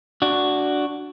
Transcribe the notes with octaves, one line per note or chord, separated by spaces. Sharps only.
D4 F#4